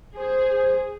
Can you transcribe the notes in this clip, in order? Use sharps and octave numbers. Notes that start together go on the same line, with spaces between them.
G#4 C5